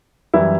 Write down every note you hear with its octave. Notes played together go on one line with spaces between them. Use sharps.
F#2 E3 G3 E4